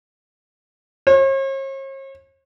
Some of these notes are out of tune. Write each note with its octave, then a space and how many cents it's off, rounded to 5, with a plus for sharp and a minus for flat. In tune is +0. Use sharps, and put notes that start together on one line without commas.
C#5 -45